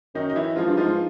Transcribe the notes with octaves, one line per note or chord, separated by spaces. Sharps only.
F#2 D#3 D#4
D#4
E3 E4
G#2 F3 F4
G2
G#2 F3 F4